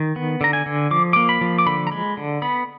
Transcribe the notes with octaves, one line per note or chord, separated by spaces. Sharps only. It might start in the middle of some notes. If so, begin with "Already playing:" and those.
Already playing: D#3
B3
D3 A#5
G#5
D3
F3 D6
A#3 D6
B5
F3
D6
D3 B5
A#5
G#3 B5
D3
B3 B5